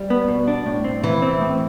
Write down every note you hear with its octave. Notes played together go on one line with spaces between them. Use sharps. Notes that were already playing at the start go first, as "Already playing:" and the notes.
Already playing: G3
B3
B2
D4
A2
C4
C3 E3
C4
A2